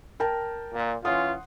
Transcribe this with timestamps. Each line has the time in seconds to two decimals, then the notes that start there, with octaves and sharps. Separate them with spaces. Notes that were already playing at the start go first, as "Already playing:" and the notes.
0.20 A#4 G5 A5
0.74 A#2
1.05 E3 C#4 F4 F#5 C6 D#6